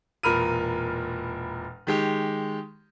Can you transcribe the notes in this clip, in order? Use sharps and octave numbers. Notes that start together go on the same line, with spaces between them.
E1 A#2 A#4 B5 F6 D#7
D#3 G#3 G4